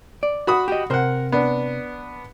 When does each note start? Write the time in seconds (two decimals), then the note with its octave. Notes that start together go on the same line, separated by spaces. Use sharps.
0.23 D5
0.47 F#4 B5 D#6
0.68 G4 D#5
0.90 C3 A#4 C5 F#5
1.32 B3 D4